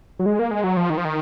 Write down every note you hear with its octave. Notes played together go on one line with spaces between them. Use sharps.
F#3
G#3
A#3
G#3
F#3
F3
D#3
F3
D#3